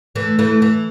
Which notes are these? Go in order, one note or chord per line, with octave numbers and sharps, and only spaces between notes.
E3 A3
E3 A3
E3